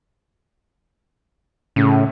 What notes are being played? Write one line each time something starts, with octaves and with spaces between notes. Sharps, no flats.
A2 C#3